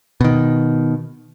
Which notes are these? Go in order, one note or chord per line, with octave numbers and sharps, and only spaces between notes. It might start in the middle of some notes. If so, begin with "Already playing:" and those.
B2 D#3